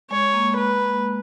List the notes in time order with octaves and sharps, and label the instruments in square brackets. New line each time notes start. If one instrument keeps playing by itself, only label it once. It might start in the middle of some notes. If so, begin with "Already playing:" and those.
[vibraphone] G#3 [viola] C#5
[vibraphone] A#3
[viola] B4